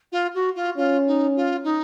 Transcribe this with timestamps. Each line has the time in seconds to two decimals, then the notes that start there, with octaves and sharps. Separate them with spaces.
0.12 F4
0.34 F#4
0.55 F4
0.77 C#4 F4
1.07 D#4
1.36 F4
1.64 D#4